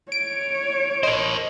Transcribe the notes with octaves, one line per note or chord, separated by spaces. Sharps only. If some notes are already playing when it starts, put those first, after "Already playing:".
C#5 D7
A#4 C5 D#5